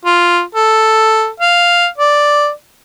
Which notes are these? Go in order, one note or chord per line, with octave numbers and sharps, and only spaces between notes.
F4
A4
F5
D5